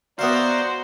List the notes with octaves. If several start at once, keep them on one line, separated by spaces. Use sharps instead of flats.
B3 F#4 C5 D5 E5 F5 A#5